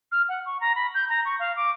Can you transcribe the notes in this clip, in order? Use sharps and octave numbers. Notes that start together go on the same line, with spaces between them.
F6
F#5
C#6
A#5
B5
G6
A#5
C#6
F5
D6